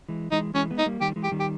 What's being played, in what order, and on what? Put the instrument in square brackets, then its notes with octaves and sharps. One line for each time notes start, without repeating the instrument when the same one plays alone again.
[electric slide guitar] E3 G#3
[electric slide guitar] E3 G#3 [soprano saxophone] D#4
[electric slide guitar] E3 G#3 [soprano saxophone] C#4
[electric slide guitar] G#3 B3
[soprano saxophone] D#4
[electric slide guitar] G3 A#3
[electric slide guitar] D#3 G3 [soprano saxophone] G4
[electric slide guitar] E3 G#3
[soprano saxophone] G4
[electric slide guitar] D#3 G3
[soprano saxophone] G4